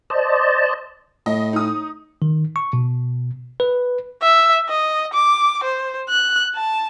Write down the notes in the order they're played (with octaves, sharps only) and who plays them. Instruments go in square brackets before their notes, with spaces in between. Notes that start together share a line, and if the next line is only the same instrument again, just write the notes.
[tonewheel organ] C5 D5 D#5 A5
[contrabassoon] A2 [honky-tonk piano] D#5
[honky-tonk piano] D#4 D#6
[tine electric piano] D#3
C#6
B2
B4
[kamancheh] E5
D#5
D6
C5
F#6
A5